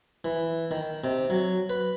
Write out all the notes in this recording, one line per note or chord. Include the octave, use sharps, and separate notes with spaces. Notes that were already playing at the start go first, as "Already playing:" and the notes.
E3
D#3
C3
F#3
B4